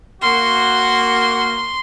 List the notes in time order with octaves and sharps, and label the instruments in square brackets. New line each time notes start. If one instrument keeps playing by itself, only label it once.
[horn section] A#3 F#4 [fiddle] C6